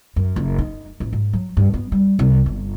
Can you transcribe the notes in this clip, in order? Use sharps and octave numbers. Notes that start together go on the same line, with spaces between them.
F#2
F#1
D#4
A1
G#2
F#3
G2
B3
G3
C2
G1